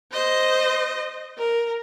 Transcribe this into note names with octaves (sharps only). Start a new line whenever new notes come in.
C5 D#5
A#4